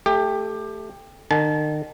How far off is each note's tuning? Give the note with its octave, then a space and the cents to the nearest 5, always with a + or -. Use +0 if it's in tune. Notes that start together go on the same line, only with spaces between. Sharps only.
A3 +0 G4 +20
D#3 -40 A5 -40